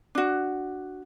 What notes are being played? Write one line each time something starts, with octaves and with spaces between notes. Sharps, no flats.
D4 F#4